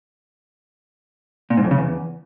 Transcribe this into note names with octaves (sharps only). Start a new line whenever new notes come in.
A#2
G#2
F2
C#3
E2